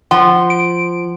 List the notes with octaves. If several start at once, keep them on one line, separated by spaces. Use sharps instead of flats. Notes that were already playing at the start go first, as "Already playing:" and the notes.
F3 F#5 C6
D7